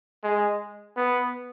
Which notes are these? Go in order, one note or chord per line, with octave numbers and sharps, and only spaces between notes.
G#3
B3